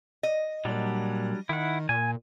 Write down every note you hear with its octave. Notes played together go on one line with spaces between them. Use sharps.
D#5
A#2 F#3 G3 D4
D#3 E4 F#5
A#2 G#5